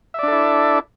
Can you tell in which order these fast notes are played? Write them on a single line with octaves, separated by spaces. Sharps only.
E5 D5 D4 A4 E4